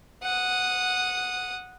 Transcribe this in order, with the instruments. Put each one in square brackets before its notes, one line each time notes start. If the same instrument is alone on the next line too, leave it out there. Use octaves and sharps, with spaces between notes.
[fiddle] F#5 D#6